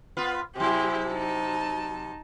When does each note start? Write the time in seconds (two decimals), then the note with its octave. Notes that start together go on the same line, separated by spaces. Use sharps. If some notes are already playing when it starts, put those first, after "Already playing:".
0.17 B3 F4 B4
0.56 C3 F#3 E4 G4 G#4
1.08 D#4 A5